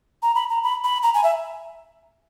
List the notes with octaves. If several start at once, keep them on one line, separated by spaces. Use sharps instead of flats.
A#5
B5
A#5
B5
B5
A#5
G#5
E5